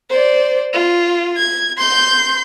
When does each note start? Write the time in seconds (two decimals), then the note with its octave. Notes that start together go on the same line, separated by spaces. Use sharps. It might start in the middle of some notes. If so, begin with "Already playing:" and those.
0.10 C5 D5
0.73 F4
1.37 G#6
1.77 C6 G6